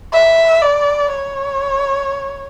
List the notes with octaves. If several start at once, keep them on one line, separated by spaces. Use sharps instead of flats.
E5
D5
C#5